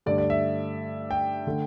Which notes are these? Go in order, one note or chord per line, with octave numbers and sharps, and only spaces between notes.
G2 D3 A3 D5
D5
E5
G5
D3 A3